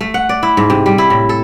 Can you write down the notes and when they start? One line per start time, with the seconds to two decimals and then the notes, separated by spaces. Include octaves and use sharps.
0.01 A3
0.14 F#5
0.29 D5
0.43 E4
0.57 G#2
0.70 C3
0.86 G3
0.98 E4
1.10 A2
1.29 A4